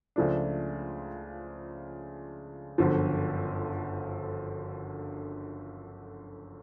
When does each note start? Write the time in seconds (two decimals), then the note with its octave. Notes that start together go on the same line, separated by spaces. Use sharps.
0.16 C#2 C#3 F3 A3 D4
2.78 G1 F#2 D3 F3